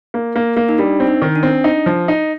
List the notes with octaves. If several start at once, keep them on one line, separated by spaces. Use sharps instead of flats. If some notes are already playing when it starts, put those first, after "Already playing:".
A#3
A#3
A#3
D#4
G3 D4
C4
D#4
D#3
D4
C4
D#4
F3
D#4